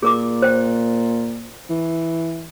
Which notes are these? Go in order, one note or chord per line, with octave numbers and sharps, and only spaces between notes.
A#2 G#4 A#4 D6
C5 G5
E3